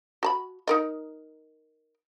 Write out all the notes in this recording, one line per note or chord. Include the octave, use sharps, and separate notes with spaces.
F#4 A5 B5
D#4 A#4 D#5